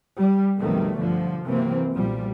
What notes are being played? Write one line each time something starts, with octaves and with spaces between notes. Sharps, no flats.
G3
B1 F2 B2 D#3 G3 A3
G2 D3 F3
C3 E3 F#3 A#3 C4
B1 A#2 F3 G3